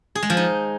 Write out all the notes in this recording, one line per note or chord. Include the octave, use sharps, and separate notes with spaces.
G#4
G#3
F3
D#4